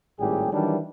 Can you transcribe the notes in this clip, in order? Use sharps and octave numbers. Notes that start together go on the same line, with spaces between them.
G#1 A2 G3 G4 G#4
D#3 E3 F#3 G3 D4